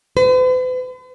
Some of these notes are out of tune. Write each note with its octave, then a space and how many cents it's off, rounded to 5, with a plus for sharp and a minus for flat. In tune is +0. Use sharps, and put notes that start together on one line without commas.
B4 +45